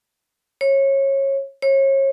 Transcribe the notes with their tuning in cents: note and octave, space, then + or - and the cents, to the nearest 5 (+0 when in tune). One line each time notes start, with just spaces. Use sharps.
C#5 -25
C#5 -35